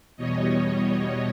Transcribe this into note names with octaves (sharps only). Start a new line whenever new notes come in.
E2 B2 G3 C#5 D#5